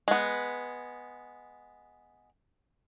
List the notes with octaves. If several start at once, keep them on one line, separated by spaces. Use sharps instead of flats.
G#3 B3